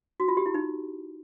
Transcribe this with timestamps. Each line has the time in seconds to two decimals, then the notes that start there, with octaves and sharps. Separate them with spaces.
0.20 F#4
0.28 F4
0.37 G4
0.46 E4
0.54 D#4